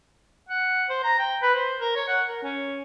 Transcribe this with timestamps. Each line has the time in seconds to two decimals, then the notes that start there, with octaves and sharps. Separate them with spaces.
0.49 F#5
0.89 C5
1.04 A#5
1.19 G5
1.42 B4
1.54 C5
1.80 A#4
1.95 C#5
2.08 F#5
2.28 A#4
2.43 C#4